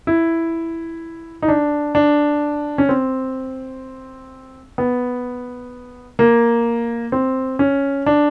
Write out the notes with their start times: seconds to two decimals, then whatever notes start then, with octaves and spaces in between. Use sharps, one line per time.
0.07 E4
1.42 D#4
1.48 D4
1.95 D4
2.78 C#4
2.89 C4
4.78 B3
6.19 A#3
7.12 C4
7.59 C#4
8.06 D4